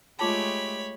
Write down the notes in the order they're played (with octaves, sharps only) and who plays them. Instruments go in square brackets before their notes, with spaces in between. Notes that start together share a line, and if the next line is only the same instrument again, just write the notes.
[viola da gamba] G#3 A3 G4 [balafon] F4 A5 [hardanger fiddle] C#5 B5